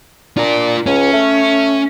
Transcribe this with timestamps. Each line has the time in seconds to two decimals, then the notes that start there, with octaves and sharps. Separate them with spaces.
0.37 D4 F4 A#4
0.87 C#2 C#4
1.13 A3